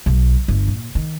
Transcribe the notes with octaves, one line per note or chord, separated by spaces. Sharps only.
B1
G1
A#2
D#3